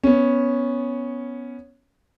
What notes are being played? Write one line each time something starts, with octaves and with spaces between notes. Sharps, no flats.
B3 C#4